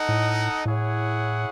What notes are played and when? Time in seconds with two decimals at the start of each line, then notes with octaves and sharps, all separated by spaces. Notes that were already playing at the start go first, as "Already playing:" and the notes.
Already playing: D#4 A4 D#5 F#5
0.09 A2
0.65 A2 E4 G#4 C#5 F#5